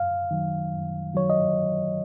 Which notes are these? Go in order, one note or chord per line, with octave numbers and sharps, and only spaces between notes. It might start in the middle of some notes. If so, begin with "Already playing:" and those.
Already playing: F#2 F5
D#3 F#3
F#2
D#3 F#3 C#5
D#5